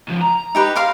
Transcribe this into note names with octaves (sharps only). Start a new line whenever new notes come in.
C#2 F3
A#5
D#4 G4 B4
A#4 F5 C6